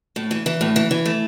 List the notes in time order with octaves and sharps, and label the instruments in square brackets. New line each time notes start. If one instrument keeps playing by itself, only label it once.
[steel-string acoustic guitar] A2
E3
E3
A2
E3
E3
A3